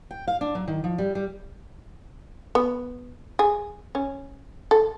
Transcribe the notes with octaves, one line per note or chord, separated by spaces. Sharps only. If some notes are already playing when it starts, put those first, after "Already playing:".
G5
F5
D4
F#3
D#3
F3
G3
G3
B3
G#4
C#4
A4